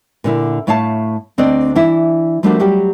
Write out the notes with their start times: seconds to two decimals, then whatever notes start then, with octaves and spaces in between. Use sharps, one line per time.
0.24 A#2 D3 E4
0.67 A2 A3 C#5 F5 G#5 A5
1.38 D2 C4 D4 D5 D#5
1.75 E3 D4 E4
2.43 F3 G3 A3 A#3 D4 F#4
2.60 F#3 G3 F#4 G4